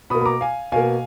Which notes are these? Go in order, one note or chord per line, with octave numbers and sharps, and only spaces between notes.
B2 A#3 B5 D#6
B5
A#5 D6
F5 G#5
B2 A#3 F5 G#5